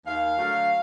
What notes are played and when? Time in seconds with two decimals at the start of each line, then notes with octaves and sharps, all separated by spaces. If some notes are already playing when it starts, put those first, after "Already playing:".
0.06 D#2 F5
0.38 D3 F#3 A3